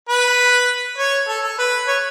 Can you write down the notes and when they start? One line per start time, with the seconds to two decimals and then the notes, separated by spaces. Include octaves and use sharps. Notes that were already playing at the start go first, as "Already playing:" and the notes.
0.09 B4
0.98 C#5
1.28 A4
1.44 A4
1.58 B4
1.88 C#5